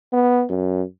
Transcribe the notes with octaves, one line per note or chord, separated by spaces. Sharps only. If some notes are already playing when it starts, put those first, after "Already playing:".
B3
F#2